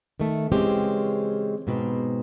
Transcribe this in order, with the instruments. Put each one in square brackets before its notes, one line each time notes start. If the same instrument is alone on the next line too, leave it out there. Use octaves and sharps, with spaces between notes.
[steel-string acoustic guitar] D#3 A3
C#3 E3 G#3 C4 C#4 G4
G#2 B2 C4